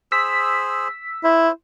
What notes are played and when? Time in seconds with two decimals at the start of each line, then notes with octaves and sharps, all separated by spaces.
0.12 G#4 C5 E6 B6
1.24 E4 C5